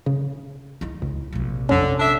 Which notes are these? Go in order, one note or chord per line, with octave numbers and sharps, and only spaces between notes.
C#3
D#4 E4
C#2
A#1 C3
F2 D3 C#4
D4 E5